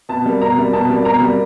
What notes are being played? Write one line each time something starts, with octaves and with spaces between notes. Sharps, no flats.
B2 A5
G3 A#3
B2 A#5
G3 A#3
B2 A5
G3 A#3
B2 A#5
G3 A#3